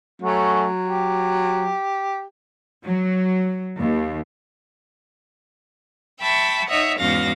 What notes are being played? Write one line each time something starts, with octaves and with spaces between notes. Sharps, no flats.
F#3 A3 C#4 F#4
G4
F#3
D#2
E5 G5 A5 B5 C#6
D#4 C#5 D#5 E5 F#5
E2 G#2 C#4 F#4 F5 A#6